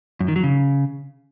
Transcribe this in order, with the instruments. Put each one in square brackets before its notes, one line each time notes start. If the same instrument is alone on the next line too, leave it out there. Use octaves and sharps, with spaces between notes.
[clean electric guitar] F#2
D#3
F#3
C#3